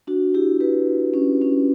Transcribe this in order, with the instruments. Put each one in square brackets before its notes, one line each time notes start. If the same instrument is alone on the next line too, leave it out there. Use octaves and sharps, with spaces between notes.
[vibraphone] D4 F#4
E4 G4
G4 B4
C#4
C#4